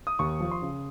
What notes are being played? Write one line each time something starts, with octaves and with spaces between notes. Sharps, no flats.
D#6
D#2 C#6
F3
C6
C#3